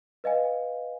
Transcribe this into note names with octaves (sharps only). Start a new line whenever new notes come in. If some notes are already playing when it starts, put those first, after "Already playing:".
B4 D#5 F5 G#5